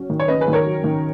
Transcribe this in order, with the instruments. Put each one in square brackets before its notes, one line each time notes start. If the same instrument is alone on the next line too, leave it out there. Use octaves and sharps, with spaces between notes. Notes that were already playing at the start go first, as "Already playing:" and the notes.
Already playing: [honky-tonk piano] F#3 C#4
D#3
[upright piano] C#5
[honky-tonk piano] C#4 [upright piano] B4 D#5
[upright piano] G#4 B4
[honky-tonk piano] D#3
[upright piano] A#4 C#5
[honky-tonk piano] F#3
D#3